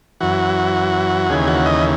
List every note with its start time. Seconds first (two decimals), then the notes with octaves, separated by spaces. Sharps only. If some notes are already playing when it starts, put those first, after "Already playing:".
0.20 F#2 E3 F#4
1.29 D#2 C#3 E3 G#4
1.47 F#4
1.66 D#5